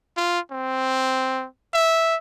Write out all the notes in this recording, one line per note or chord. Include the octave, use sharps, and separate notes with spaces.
F4
C4
E5